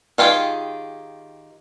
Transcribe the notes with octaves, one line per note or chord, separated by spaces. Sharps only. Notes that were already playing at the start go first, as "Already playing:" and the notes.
D#3 F4 G4 G#4